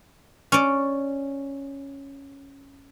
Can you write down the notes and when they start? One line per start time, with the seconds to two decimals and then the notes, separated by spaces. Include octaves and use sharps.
0.52 C#4 D5